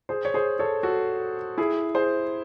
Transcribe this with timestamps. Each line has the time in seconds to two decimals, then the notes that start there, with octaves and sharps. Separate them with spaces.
0.09 G#4 C5
0.25 C#5
0.34 G#4 C5
0.59 A4 C#5
0.83 F#4 A4
1.58 E4 G#4
1.95 G#4 C5